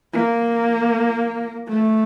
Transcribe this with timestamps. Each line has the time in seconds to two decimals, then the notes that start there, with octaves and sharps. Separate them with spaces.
0.13 A#3
1.68 A3